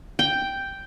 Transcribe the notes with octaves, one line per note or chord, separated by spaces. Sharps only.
G5